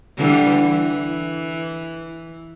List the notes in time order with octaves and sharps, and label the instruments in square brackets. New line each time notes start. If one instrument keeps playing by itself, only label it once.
[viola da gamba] D3 E3 G3
E3